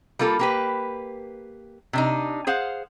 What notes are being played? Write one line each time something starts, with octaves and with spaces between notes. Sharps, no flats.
G3 A#3 F4 A4
A#3 G4 B4
C3 D4 D#4
G#4 C5 F5 F#5